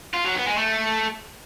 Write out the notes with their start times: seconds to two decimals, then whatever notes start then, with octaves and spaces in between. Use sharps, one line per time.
0.14 F4
0.25 F#3
0.36 B3
0.47 G#3
0.58 A3